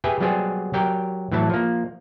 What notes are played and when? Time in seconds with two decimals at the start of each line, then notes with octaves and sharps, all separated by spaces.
0.04 G4 G#4 B4 E5 G5 G#5
0.20 F#3 G3 B3 G4 G#4 C5
0.73 F#3 G4 A#4 G5
1.31 A2 E3 F#3 E4 A5
1.50 F3 A#3